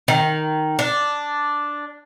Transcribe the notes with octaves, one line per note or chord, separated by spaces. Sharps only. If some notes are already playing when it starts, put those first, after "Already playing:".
D#3
D4